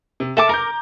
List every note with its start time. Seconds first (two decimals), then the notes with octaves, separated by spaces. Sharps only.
0.20 C3
0.37 A4 E5 A5 D6
0.49 A#4 A#5 D6 G6